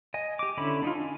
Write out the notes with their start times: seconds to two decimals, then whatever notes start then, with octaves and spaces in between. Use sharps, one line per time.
0.14 D#5 G#5
0.39 G4 D6
0.57 D3 C#4 E4 B5
0.82 D4 D#4 F4
0.95 G#5